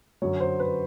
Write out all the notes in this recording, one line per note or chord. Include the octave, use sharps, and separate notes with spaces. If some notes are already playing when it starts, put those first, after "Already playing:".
F#2 D3 F#3 C#5
C5
B4